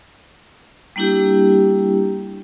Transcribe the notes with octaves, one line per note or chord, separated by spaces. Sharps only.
G3 A#3 D4 E4 G4